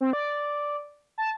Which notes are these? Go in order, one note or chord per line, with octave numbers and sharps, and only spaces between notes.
C4
D5
A5